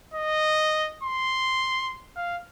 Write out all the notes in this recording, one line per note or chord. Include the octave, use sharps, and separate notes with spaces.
D#5
C6
F5